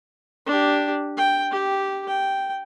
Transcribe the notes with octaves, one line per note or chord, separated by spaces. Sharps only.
D4 G4
G5
G4
G5